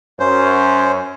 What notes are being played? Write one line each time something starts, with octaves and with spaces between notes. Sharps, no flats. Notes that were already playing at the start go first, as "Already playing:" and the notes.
F#2 C#4 C5